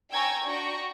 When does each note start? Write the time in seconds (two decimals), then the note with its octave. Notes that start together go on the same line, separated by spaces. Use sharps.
0.12 G5 G#5 A#5 C#6 E6 G#6
0.45 D4 F#4 G5 A#5 C#6